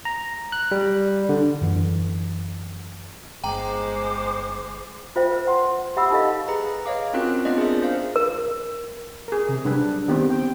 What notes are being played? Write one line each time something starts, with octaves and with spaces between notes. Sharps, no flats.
A#5
F#6
G3
D3
F#2 E3
G1 G#3 C5 G5 A#5 D6
F4 C5 E5 G5
B4 C5
F#5 G5 C6
G4 E5 F#5 B5 D#6 E6
D#4 G4 A4 D#5 F5
G#4 B4 A#5
C#5 D#5 F5 D6
C4 C#4 F4 F#4 A#4 F#6
B3 C4 D4 F4 D5 D#5
G#4 A#4 E5
C5 F5
A#4
G#4 A#4
C3
F#3 G3 D4 B4
D#3 B3 C4 G4
G5